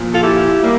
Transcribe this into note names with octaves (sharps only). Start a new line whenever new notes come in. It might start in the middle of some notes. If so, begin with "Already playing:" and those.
Already playing: A#2 F3
F4 A4
E4 G4
G3 A#3